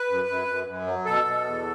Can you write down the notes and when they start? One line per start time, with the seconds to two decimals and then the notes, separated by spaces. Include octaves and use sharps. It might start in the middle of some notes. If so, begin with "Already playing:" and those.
Already playing: B4
0.09 F#2
0.28 F#2
0.48 F#2
0.67 F#2
0.87 F#3
1.06 B2 A4
1.25 B2
1.44 E2